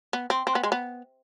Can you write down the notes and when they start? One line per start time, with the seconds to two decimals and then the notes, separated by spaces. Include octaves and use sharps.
0.13 B3
0.30 C4
0.47 C4
0.55 B3
0.63 G#3
0.72 B3